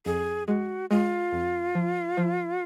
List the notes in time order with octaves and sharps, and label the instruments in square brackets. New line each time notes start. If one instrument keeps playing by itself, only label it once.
[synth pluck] F2 [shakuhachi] G#4
[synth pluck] G#3 [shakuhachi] F#4
[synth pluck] G#3 [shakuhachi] F4
[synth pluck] F2
F3
F3